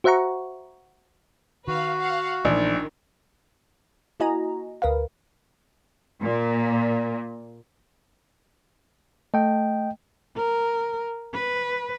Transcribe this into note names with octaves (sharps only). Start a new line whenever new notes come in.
F#4 C5 E5 F#5 A#5 C#6
D#3 F#4 B4 F5
F5 F#5
A#1 A#2 D#3 E3 A3
A#3 E4 F#4 D#5 G#5 A#5
D2 A#4 B4 F5
A#2
A3 D#5 G5
A#4
B4